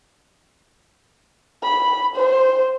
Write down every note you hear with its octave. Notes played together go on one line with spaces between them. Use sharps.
B5
C5